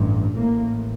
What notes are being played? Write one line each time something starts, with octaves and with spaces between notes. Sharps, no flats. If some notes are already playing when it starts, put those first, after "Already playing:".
Already playing: A1 G2
A1 A2 A#3